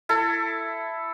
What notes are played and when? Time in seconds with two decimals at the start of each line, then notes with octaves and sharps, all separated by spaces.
0.09 E4 A4